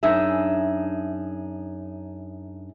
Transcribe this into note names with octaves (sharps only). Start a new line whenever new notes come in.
F#2 D4 D#4 G#4 E5